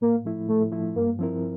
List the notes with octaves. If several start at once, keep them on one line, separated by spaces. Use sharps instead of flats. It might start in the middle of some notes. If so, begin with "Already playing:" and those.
A2 A#3
F3 A3 E4
A2 A3
F3 A3 E4
G2 A#3
F3 C4 E4 A#4